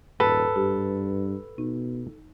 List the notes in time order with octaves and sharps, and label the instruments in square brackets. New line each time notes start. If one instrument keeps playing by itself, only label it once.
[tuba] D#1 [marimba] G#2 [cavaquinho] A4 [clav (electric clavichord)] B4
[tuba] G2 [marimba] G4
[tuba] B2 [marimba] D#4